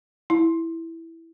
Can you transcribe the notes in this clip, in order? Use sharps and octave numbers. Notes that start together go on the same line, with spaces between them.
E4